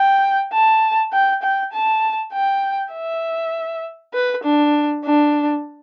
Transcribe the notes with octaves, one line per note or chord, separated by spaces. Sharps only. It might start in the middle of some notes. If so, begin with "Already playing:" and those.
Already playing: G5
A5
G5
G5
A5
G5
E5
B4
D4
D4